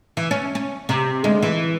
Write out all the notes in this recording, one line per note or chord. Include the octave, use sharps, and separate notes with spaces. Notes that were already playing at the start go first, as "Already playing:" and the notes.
E3
C#4
C#4
C3
D2 G#3
E3